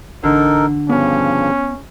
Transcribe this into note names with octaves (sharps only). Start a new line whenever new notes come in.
A1 D3 D#4 A4 A#4
G2 C#3 F3 B3 C#4